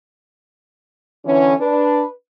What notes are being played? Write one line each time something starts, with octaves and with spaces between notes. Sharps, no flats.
D3 E3 C#4
D4 B4